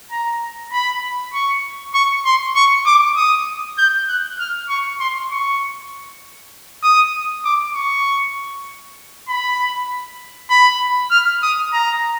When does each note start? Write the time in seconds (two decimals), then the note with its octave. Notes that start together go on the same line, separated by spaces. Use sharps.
0.11 A#5
0.72 B5
1.34 C#6
1.94 C#6
2.26 C6
2.56 C#6
2.86 D6
3.17 D#6
3.78 G6
4.08 F#6
4.39 F6
4.69 C#6
5.00 C6
5.31 C#6
6.84 D#6
7.45 D6
7.76 C#6
9.28 B5
10.51 B5
11.11 F6
11.43 D#6
11.73 A#5